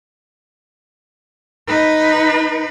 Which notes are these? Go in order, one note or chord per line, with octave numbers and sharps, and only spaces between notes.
D#4 B4